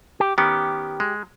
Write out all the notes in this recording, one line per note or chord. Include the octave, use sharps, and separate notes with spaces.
G4
D#3 B3 C#4 G4
G#3